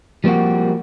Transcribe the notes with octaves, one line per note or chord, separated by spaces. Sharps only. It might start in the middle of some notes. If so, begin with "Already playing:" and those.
F3 G3 A#3 C4 F#4